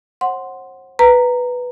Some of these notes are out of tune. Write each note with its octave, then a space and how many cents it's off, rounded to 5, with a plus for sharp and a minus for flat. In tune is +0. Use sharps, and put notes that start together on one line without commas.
C5 +40 F#5 +0 C6 +0
B4 +0 A#5 -10